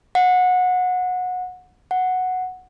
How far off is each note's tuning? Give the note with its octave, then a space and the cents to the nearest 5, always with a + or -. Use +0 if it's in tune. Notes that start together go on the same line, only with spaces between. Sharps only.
F#5 -20
F#5 -5